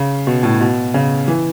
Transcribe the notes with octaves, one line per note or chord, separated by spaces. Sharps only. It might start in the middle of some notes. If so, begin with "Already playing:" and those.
Already playing: C#3
B2
A2
B2
C#3
E3